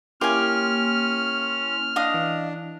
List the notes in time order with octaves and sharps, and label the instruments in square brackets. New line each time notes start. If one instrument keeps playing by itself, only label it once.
[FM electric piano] A#3 E4 C6 [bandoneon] C#4 [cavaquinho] G4 G#5 [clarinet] F6
[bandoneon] D4 [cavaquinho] D#5 F5 D#6
[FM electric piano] E3